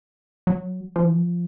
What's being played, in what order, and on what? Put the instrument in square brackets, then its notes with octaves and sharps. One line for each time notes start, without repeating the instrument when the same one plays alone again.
[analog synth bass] F#3
F3
E3
F3